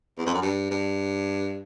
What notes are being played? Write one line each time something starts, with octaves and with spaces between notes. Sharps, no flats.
E2
F2
F#2
G2
G2